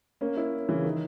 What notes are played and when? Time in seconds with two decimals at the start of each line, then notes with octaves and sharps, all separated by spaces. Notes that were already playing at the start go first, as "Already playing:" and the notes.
0.21 A#3 C#4
0.37 C#4 E4
0.69 C#3 E3
0.84 D#3